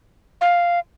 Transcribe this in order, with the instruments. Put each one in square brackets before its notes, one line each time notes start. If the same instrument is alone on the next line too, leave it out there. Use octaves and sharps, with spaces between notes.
[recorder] F5